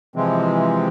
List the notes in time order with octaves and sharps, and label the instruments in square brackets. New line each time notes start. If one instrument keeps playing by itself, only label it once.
[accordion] C3 E3 F3 G#3 C4